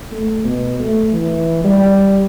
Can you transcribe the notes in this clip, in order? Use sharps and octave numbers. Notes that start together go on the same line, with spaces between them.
A3
B2
A3
E3
G3